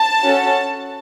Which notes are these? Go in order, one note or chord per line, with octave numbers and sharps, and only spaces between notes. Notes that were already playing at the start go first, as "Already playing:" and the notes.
Already playing: A5
C#4 F#4 A4